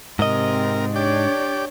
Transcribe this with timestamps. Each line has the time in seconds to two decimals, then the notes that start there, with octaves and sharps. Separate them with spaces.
0.19 G#2 C3 C4 A#4 D#5
0.96 D4 G4 C#5 D5